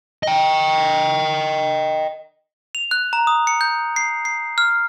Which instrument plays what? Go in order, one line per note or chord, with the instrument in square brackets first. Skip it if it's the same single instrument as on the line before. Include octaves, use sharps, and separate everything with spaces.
[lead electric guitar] D#5 G5
[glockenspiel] F7
F#6
A#5
D#6
C#7
G6
C7
C7
F6